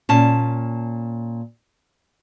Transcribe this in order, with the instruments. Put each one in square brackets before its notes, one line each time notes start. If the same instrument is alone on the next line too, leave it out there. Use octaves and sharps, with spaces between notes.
[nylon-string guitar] A#2 C#4 A5